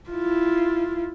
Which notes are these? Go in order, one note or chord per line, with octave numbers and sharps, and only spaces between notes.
E4 F4